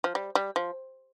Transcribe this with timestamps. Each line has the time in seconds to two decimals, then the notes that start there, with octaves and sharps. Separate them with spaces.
0.04 F3
0.15 G3
0.35 G3
0.56 F3